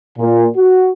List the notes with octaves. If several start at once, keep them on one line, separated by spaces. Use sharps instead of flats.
A#2
F#4